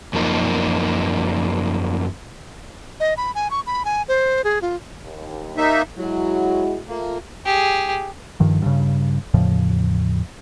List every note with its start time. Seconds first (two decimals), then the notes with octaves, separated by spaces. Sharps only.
0.13 F#2 F3 A#3 D#4
3.00 D#5
3.17 B5
3.35 G#5
3.51 C#6
3.67 B5
3.85 G#5
4.08 C5
4.44 G#4
4.62 F4
5.03 D#2
5.57 A#3 D#4 E5
5.97 F#3 G#3 E4 F#4
6.87 A3 A#3 F4
7.45 G4 G#4
8.40 G2 D#3 F3
8.62 G2 C#3
9.34 E2 A2 C#3 F3